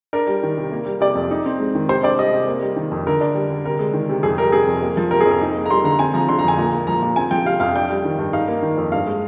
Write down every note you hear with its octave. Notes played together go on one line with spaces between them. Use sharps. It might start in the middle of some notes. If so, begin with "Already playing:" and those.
D4 A#4
G3
D#3
C3
A#3
G3
C3 D5
F2
D#4
C4
G#3
D#3
C3 C5
D4 D5
G3 D#5
C3
A#3
G3
D#3
F2
D3 A#4
D4
G3
D3
C3 A#4
G#3
D#3
C3
F2 G#4
G3 A#4
C3 G#4
F2
A#3
F3
C3 A#4
G#4
F2
A#4
D#4
A#3
A#5
G3 C6
D3 A#5
C4 G#5
F3 A#5
D3 C6
A#5
F2 G#5
A#2 A#5
A#3
F3 A#5
A#2
C4 G#5
F3 G5
C3 F5
F2 F5
D4 G5
G3
D#3
G2
D#4 F5
A#3
D#3
F2
G2 F5
G#3